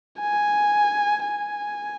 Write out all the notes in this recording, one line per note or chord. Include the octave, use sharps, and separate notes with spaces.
G#5
G#5